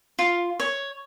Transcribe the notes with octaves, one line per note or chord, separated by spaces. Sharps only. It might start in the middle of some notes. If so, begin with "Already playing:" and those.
F4
C#5